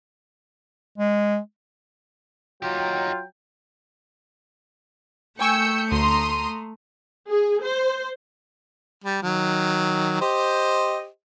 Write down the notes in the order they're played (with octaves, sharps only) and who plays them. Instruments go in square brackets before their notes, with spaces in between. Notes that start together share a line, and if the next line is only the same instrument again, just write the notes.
[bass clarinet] G#3
[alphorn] F#3 [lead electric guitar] D#4 G4 [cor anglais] F4 [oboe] G5
[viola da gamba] A3 [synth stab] G5 G#5 C#6 [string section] E6 G6 C#7
[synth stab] D2 [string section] A#5 C6 D#6
[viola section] G#4
C5
[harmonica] G3
D#3 F#3
G4 C5 D#5